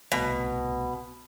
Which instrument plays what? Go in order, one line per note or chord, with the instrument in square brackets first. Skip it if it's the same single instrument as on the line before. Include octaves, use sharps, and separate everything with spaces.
[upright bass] D1 C2 [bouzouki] B2